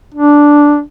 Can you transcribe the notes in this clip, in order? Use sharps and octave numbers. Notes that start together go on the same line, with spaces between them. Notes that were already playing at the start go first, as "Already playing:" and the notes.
D4